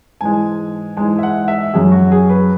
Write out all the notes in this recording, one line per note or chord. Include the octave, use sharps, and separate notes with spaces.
G#2 E3 G#3 G#5
G#2 E3 G#3 G#5
E5
F#5
E5
F#2 F#3 G#4
F#4
G#4
B4